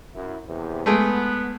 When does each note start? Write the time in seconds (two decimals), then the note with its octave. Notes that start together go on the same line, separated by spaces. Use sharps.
0.14 F#2 E4
0.46 E2 C3
0.86 G#3 A3 B3